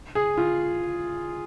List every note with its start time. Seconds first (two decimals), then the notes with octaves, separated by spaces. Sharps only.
0.15 G#4
0.37 F4